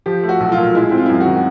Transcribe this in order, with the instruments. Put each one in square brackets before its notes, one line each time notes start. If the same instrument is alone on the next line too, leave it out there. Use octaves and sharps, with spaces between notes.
[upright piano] F3 [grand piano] G4
[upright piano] A3
[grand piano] F#4
[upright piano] B1
[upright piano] A#2 [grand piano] F4
[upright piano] G#3 [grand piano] E4
[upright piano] C4 [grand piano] E4
[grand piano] F4
E4
[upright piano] F#2 [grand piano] F4
[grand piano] F#4
[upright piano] D#3